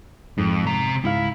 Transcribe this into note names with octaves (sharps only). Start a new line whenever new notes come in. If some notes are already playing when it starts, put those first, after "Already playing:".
F2 G#2
C3 A#5
C#2 G#2 E4 F5